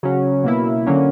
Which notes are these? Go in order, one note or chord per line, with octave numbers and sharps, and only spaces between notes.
C#3 F#3 C#4
B2 A#3 E4
D3 F#3 A#3 C#4